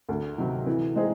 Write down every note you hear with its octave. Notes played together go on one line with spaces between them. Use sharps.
D2
C3 D#3 F#3
E3
G#3 C4 D#4 G#4